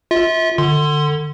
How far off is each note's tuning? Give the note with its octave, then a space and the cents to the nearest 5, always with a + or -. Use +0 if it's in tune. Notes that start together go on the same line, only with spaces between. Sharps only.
F4 +0 E5 -35
D3 +25 C6 +0